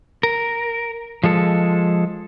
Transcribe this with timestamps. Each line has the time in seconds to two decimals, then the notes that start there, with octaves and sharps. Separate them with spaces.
0.23 A#4
1.23 F3 G#3 A4